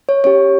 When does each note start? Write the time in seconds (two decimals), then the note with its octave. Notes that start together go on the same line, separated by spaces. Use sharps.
0.09 C#5
0.24 C#4 G4 C#5